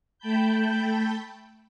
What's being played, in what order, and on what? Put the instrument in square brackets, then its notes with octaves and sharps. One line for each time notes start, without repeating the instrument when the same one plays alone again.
[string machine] A3 G5 A5 B5 G6